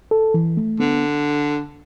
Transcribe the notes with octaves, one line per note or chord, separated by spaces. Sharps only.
A4
E3
A3
D3 B3